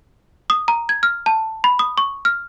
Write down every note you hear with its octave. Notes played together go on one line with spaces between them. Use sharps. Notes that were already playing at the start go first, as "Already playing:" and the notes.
D#6
A#5
G#6
F6
A5
B5
D#6
C#6
F6